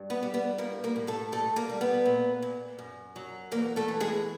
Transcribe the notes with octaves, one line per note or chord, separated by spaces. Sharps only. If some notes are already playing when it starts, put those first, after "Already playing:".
Already playing: G2
B3 B4
G3
B3 B4
A2 A#3 A#4
A#3 A#4
A2
A3 A4
G2 A3 A4
A#3 A#4
G3
B3 B4
A#2
A#2
F#2
F#3
E2 A#3 A#4
A3 A4
E3
G#3 G#4